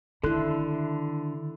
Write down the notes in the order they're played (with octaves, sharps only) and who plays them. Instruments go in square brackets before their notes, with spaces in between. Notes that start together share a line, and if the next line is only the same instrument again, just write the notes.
[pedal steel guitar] D3 C6 F#6 [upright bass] D#3 [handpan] E4 A4